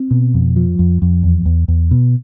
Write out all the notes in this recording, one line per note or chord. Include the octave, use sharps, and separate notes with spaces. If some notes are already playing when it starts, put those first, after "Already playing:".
Already playing: C4
B2
F2
F3
F2
F2
E2
E2
E2
B2